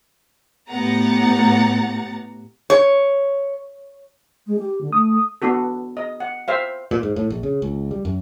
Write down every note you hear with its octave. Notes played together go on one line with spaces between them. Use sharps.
A2 B3 G4 F#5 A#5 A6
C#5
G#3
G4
D3
A3 D#6
B3 D4 F#4 A4
D#5
F#5
C5 E5 F5
A#2
G#2
A2
A#1
C#3
C#2
G3
F#2